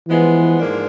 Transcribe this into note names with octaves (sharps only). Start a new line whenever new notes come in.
E3 F3 G#3 B3
G#2 F3 A#3 D4